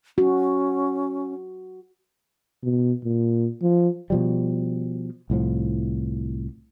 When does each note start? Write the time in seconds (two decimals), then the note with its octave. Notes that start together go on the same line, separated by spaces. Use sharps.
0.18 C#4 F#4
2.63 B2
3.04 A#2
3.62 F3
4.10 B2 F3 G3
5.30 C2 A2 F3